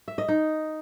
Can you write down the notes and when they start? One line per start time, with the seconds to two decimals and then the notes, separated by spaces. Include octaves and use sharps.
0.08 E5
0.18 D#5
0.28 D#4